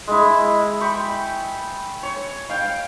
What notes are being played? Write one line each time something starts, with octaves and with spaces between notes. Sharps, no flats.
G#3 E4
G5 B5 C#6
C#5
F5 G5